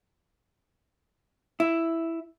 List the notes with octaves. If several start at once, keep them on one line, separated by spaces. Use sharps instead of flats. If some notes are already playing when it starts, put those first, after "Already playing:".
E4